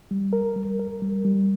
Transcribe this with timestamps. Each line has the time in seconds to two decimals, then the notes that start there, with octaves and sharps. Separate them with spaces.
0.11 G3
0.33 A#4
0.56 G3
0.79 A#4
1.02 G3
1.25 G3